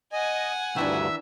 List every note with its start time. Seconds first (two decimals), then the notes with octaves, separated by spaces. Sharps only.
0.13 D#5 F#5 G#5
0.76 D2 G2 D#3 E3 D4 E5